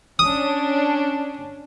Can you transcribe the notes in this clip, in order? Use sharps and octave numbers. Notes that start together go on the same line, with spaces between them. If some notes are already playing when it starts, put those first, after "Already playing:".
C#4 D4 D#6